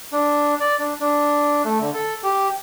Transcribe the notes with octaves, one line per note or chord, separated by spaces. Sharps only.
D4
D5
D4
D4
A3
D3
A4
G4